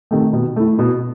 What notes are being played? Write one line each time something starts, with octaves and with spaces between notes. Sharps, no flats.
C3 D#3 A3
B2
A3 E4
B2